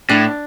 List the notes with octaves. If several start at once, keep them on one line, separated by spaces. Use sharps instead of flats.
A2 D4